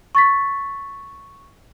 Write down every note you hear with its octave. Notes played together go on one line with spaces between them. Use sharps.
C#6 A6 B6